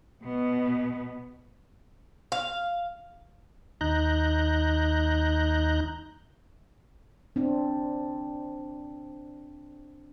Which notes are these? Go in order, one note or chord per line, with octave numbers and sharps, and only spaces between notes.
B2 B3
F5
D#2 D#4 A#5 F#6 G6
C4 D4